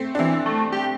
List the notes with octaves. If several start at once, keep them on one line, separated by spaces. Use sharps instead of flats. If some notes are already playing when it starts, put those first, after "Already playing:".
Already playing: A3 C4
D4
E3 C4
A3
G4